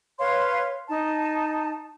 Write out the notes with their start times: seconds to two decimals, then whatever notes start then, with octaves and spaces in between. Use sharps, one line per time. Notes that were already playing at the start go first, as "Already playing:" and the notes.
0.19 B4 C#5 F5 C6
0.88 D#4 A5